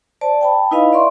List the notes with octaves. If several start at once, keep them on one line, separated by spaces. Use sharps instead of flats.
C5 D5 A5
G5 A5 B5
D#4 E4 B4 D#5 F5 B5
D5 E5 C6 C#6